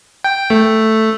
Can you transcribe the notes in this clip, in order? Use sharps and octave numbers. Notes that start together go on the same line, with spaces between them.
G5
A3